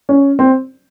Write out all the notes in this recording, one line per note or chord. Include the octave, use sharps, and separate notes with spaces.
C#4
C4